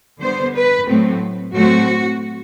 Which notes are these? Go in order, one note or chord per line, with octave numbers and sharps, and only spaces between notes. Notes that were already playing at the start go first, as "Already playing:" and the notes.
D3 G3 B3 C5
B4
A2 F#3 A3 C4
A2 F#3 A3 C4 F#4